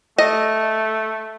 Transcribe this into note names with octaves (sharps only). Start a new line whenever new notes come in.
A3 D#5